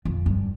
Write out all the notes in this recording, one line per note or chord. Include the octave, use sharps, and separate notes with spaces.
F2
G2